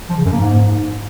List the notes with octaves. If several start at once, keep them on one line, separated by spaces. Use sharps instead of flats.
F3
C#3
F#2
A#3
G#2